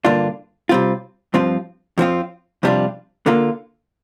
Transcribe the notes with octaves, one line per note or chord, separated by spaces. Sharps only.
G2 D3 A#3 D4 F4
C3 G3 C4 F4
G2 F3 C4 F4
F2 F3 C4 F4
F2 C3 G3 D4 F4
D3 A#3 F4